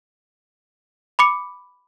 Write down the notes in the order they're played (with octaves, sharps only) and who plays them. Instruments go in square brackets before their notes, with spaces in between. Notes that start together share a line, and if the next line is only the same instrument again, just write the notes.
[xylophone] B5 D6 C#7